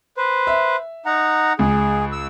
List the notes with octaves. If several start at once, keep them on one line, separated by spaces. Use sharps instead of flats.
B4 C5
E5
D#4 F#5 A#5
C#2 G#4
E6